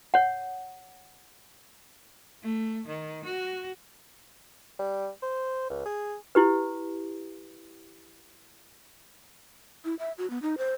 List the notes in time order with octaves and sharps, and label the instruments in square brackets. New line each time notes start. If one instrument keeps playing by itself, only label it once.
[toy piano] C#5 F#5
[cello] A3
D#3
F#4
[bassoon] G3
C5
C#2
G#4
[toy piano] E4 G4 B4
[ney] E4
E5
F#4
B3
D#4
C5